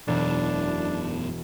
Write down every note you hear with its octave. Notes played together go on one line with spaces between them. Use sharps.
E1 F#2 B2 D4